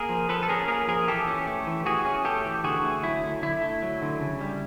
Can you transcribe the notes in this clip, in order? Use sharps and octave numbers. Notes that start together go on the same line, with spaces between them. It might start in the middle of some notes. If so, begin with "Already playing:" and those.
Already playing: A#3 G#4 A#4
F3
F3 A4 B4
A4
C#4 G#4 A#4
A#3 G#4 A#4
F3 G#4 A#4
E3 G4 A4
C#4
A3
E3
E3 F#4 G#4
C#4
A3 G4 A4
E3
D3 F#4 G#4
A3
F#3 E4
D3
D3 E4
A3
F#3
D3
C#3
G3